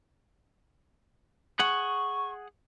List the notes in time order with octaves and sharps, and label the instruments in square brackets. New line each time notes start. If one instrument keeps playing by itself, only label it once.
[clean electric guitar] G#4 F#5 [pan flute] C#6